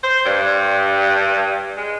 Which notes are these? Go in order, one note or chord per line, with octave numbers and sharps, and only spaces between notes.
C5
G2
G#3